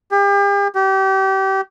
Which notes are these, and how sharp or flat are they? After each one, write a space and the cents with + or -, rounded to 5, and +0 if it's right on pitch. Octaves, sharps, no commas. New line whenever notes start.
G4 +40
G4 -30